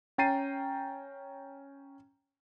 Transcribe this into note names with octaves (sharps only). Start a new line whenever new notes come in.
C#4 G5 A#5 A6 C7 D#7